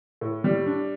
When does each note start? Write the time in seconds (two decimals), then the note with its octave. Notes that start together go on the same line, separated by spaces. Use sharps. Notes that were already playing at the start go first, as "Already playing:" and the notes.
0.21 A2
0.44 G3
0.66 D4